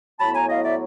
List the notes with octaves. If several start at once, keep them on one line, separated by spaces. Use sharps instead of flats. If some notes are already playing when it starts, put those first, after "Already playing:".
A2 F#3 B3 E4 A5 B5
G#5 A#5
D#5 F5
D5 E5